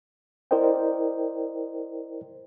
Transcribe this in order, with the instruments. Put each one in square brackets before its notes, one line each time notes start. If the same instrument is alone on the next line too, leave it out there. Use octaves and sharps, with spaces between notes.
[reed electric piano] E4 A#4 C5 D5 D#5 G5